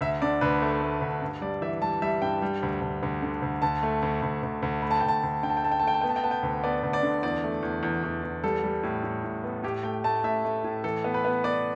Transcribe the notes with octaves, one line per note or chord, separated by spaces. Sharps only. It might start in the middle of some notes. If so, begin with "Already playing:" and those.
D2 E5
D3 D5
D2 B4
A3
A3
D2
G2
G3 D5
E3 E5
G3 A5
G3 E5
G2 G5
G3
D2
D2
D2
D3
D2
D2 A5
A3
D2
D2
D2
D2
A3 B5
A5
D2 G5
A5
D2
D3 G5
A5
G5
A3 A5
G5
A5
A3 G5
A5
B3 G5
A5
G5
B3 A5
G5
D2
B3 D5
D2
D5
D3
E2 D5
A3
E2
E2
E2
E2
G3 A4
G3
A2
A2
A2
B3
A2 G4
A3 G5
A3 A5
A2 E5
A3
A2
E3 A4
B3
B4
B3
B3 D5